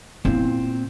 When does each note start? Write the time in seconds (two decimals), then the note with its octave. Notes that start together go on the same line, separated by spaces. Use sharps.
0.25 A#2 B3 C4 E4